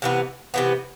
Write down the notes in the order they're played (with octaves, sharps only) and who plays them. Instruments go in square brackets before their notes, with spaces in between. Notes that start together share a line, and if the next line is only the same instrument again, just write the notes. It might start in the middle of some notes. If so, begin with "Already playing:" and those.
[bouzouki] C3 E3 B3
C3 E3 B3